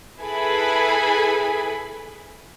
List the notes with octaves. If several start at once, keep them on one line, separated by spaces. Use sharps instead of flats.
E4 G#4 A4 B4 G#5 B5